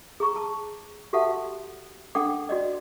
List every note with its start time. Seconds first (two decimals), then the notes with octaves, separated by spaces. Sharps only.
0.20 G#4 A#5 C#6
0.36 A5
1.13 F#4 G4 A4 E5 F#5 A5
2.15 D4 A4 F#5 G5 D6
2.49 F#4 D5 D#5